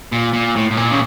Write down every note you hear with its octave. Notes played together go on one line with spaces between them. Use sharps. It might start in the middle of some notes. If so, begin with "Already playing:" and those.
A#2
A#2
A2
A2
A#2
C#3